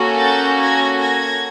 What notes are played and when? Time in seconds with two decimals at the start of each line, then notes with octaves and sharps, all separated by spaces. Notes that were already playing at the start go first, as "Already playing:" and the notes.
Already playing: A#3 C#4 F#4 A4
0.20 G6 A6
0.60 G#6 A#6
1.00 G#6 A#6